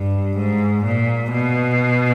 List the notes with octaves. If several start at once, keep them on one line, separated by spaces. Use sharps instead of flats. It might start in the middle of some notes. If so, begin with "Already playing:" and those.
Already playing: G2
G#2
A#2
B2